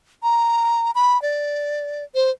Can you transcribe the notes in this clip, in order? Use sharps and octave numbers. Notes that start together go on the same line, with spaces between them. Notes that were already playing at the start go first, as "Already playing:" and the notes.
A#5
B5
D5
C5